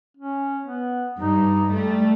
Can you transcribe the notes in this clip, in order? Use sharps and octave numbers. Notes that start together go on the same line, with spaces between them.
C#4
B3
G2 D#4
G3 A3